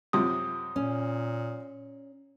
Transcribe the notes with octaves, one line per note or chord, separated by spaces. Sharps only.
F#2 C3 F3 D#6
A#2 C#4